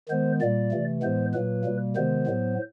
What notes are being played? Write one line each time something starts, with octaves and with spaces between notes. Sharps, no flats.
D#3 G#3 B3 C5
A#2 G3 A#3 D5
C3 E3 A3
A2 E3 G#3 B3 C5
A#2 F#3 A#3 B4
B2 G3 A#3
C3 D#3 G#3 B3 C5
A2 F#3 B3